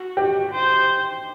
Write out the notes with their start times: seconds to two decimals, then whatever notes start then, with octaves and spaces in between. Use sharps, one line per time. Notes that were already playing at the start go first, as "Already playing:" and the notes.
Already playing: F#4
0.17 G4
0.52 C5